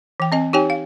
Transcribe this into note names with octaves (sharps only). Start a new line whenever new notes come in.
E3 G5
C4 D#5 G#5
D#4 G4 C#5 G5 G#5
F5